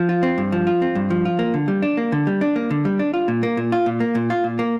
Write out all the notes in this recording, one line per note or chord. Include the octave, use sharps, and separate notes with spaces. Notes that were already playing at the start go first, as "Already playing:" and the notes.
Already playing: F3
F4
C4
G2
F3
F4
C4
G2
F3
F4
A#3
D3
G3
D4
A#3
D3
G3
D4
A#3
D3
G3
D4
F4
A#2
A#3
A#2
F4
A#2
A#3
A#2
F4
A#2
A#3